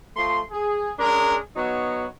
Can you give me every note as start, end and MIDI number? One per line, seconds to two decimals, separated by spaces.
0.15 0.39 53
0.15 0.39 57
0.15 0.39 84
0.51 0.89 68
0.99 1.36 56
0.99 1.36 61
0.99 1.36 62
0.99 1.36 68
0.99 1.36 70
1.55 2.05 54
1.55 2.05 59
1.55 2.05 63
1.55 2.05 66
1.55 2.05 73